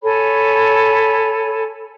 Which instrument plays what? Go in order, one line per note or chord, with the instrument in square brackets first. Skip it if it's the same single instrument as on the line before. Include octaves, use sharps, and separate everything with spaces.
[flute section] A4 C#5 G#5 B5